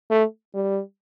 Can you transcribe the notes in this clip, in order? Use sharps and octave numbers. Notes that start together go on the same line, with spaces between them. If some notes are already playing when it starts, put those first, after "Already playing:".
A3
G3